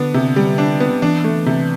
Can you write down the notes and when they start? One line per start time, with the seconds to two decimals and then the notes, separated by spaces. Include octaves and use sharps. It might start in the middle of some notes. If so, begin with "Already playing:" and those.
Already playing: D3 B3 D4
0.14 C3
0.36 G3
0.58 D4
0.80 B3
1.02 E3 D4
1.24 A3
1.46 C3